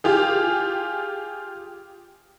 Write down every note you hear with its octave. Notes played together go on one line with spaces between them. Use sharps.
F4 G4 G#4